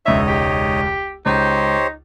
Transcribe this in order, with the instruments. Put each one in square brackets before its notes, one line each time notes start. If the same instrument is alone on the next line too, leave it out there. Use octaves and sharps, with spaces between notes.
[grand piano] E1 C#2 E6 [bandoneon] D#4 C#5 D#5 [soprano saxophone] E5
[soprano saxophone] G4
[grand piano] C#2 [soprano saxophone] D#4 [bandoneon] G4 C5 C#5